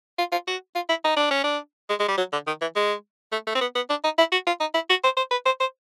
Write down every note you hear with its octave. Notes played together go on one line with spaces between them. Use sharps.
F4
F4
F#4
F4
E4
D#4
D4
C#4
D4
G#3
G#3
G3
F#3
D3
D#3
E3
G#3
A3
A3
C4
B3
B3
D4
D#4
E4
F#4
F4
D#4
E4
F#4
C5
C5
B4
C5
C5